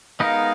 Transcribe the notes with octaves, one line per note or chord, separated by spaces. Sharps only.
G#3 B3 D#4 A#4 F5